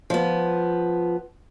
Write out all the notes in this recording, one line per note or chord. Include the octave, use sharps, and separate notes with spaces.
F3 B3